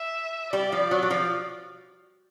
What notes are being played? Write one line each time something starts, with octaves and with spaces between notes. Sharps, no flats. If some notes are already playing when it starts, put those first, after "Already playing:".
Already playing: E5
G3 D5
F3
F#3
F#3
F3